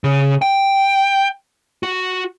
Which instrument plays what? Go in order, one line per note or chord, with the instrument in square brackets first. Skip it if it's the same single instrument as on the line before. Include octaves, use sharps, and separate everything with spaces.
[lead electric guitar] C#3
G5
F#4